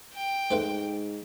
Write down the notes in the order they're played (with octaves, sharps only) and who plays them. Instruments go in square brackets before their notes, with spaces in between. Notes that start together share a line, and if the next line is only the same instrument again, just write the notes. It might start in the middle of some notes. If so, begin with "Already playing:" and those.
[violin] G5
[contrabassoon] G#2 [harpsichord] A3 B4 C5